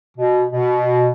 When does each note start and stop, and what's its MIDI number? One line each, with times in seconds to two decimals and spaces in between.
0.17 0.45 47
0.52 1.09 47